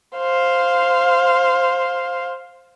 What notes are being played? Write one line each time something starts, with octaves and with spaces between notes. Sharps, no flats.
C5 F5